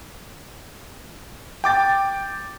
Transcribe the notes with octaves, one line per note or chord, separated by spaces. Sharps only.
G5 D6 A6